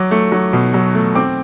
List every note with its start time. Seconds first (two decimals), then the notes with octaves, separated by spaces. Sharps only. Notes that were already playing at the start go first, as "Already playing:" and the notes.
Already playing: F#3 D6
0.11 A3
0.32 F#3
0.53 B2
0.74 F#3
0.95 A3
1.15 C4 D6